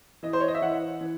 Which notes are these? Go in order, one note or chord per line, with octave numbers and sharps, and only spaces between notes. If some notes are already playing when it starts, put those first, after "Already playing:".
E3 D#5
C5
C#5
D#5
E5
E3 F#5
E3